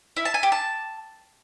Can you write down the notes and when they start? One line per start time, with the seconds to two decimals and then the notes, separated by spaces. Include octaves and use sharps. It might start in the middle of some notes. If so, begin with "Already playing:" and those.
0.17 E4
0.25 A5
0.34 G#5
0.43 G4
0.52 A5